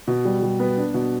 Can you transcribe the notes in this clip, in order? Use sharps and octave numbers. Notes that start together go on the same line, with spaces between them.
B2
G3
G3
B3
D4
B2